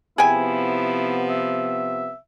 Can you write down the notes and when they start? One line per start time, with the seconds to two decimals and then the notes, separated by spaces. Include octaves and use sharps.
0.18 C3 F3 B3 E4 G#4 G5 G#5
1.29 E5